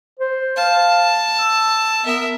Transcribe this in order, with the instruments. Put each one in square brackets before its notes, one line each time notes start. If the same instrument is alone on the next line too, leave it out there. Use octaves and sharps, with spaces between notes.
[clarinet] C5
[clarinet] F5 [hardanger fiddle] A5
[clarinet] E6
[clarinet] B3 [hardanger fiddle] A#4 E5